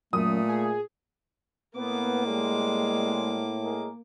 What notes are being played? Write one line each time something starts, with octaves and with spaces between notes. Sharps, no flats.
F#2 A#2 A3 D#6
G#4
A2 A#3 B3 D6
G3 G#3
G#3 G#4 A#4